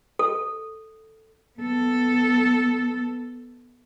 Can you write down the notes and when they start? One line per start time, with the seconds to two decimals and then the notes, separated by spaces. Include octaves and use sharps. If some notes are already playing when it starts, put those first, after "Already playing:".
0.19 A4
1.59 B3 A4